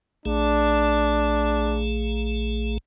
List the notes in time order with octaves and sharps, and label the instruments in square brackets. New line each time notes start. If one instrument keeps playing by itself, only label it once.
[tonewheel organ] A#1 A3 G#4 [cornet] D4